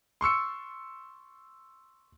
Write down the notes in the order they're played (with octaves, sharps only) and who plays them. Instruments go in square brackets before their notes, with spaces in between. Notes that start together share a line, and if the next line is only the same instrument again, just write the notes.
[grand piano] C6 C#6 E6 C#7